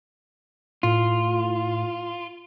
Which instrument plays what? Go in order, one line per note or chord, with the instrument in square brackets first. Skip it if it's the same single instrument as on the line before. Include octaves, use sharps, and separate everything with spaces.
[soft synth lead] A2 [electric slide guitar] F4